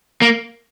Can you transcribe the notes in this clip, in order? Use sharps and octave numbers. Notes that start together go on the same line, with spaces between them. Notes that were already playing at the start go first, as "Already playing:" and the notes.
A#3